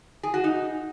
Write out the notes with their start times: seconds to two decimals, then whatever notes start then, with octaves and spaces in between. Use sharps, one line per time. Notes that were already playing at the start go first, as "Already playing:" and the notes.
0.23 G#4
0.34 F#4
0.44 D#4